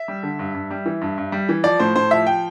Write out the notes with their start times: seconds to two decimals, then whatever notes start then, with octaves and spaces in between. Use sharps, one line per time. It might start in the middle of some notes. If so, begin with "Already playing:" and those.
Already playing: E5
0.08 G3
0.23 D3
0.39 G2
0.55 G2
0.70 G3
0.86 E3
1.01 G2
1.18 G2
1.32 G3
1.49 E3
1.64 F3 D5
1.79 A2 C5
1.96 A2 C5
2.11 F3 E5
2.27 F3 G5